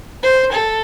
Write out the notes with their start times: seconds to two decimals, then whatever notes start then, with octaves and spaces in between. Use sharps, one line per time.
0.23 C5
0.53 A4